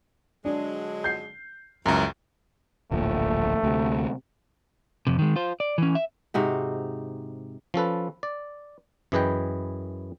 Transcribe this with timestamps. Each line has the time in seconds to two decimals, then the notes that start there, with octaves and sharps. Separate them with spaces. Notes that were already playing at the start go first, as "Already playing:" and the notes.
0.45 D3 F#3 G#3 D4
1.04 G6 C7
1.86 C#2 F#2 F3 A#3 E4 A#5
2.91 D1 A#1 F3 A3
3.64 D2 C3
5.07 F2 C3
5.19 D#3 G#3
5.36 F4 C5
5.60 D5
5.78 E3 C#4
5.95 E5
6.34 G#2 C3 D#4 F#4
7.74 F3 C#4 A4 B4
8.23 D5
9.12 F#2 E3 G#4 B4 D#5 G5